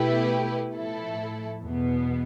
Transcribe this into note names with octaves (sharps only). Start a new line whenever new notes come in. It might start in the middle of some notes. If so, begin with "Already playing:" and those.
Already playing: B2 A3 E4 G4 B4
A2 F3 A3 E4 A4
E2 B2 B3